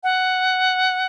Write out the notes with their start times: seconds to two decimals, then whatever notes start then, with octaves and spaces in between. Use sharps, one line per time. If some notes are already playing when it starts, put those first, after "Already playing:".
0.03 F#5